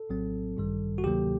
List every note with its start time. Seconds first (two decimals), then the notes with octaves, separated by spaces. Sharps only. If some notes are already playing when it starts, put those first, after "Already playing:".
Already playing: A4
0.09 A#1 A2 F#3 C4
0.57 A1 G2 D#3 G3
0.98 F#4
1.04 D2 C3 D#3 F#3 A#3 G4